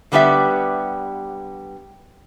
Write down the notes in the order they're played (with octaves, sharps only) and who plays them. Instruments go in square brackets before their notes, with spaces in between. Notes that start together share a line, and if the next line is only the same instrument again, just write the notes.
[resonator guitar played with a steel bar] D3 G3 B3 G4 E5